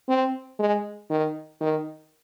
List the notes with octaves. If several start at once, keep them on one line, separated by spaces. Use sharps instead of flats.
C4
G#3
D#3
D#3